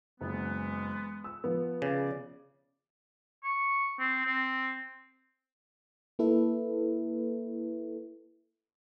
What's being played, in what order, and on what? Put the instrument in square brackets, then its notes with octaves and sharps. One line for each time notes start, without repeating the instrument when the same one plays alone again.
[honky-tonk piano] F#1 [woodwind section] E3 G#3 B3
[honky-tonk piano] E6
F3 B3
[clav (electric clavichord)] C#3 [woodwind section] D5
[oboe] C#6
C4
C4
[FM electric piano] A#3 E4 A4 B4 E5